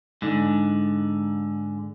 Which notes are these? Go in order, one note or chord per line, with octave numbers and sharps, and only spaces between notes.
G#2 D3